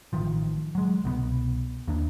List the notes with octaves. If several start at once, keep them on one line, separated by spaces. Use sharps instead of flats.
A1 D#3 F3
F#3 G#3
C2 B2 F3 B3
D#2 A#3 D4